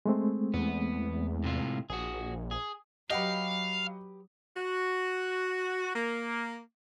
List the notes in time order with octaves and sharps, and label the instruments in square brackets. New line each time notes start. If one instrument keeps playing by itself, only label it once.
[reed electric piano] G#3 A3 C4
[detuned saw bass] E2 [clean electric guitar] B3
[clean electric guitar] A2 C3 F4
[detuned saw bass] A#1 [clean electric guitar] F#4 G#4
[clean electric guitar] G#4
[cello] F#3 [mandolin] G4 B4 [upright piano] D#5 F#5 [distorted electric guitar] F5
[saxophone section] F#4
A#3